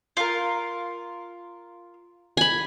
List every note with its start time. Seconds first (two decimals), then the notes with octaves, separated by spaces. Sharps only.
0.17 F4 A#4
2.37 G#5 B5